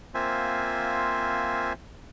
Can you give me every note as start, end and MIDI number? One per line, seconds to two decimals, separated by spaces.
0.14 1.73 58
0.14 1.73 60
0.14 1.73 65
0.14 1.73 72
0.14 1.73 76
0.14 1.73 80